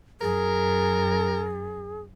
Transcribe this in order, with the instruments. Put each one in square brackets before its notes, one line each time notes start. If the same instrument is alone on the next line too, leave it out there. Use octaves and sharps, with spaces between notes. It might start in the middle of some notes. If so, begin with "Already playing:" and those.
[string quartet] F#2 [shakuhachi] G#4 [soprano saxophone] A#4